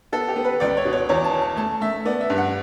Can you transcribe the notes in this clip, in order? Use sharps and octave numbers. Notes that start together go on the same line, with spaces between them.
B3 A4
G4
B3
B4
C#2 D5
C#5
B2
C#5
E2 C#5
A5
C#4
A5
A3 A5
A3 E5
B3 D5
E5
G2
F#5